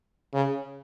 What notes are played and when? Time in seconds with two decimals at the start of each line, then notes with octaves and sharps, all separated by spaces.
0.34 C#3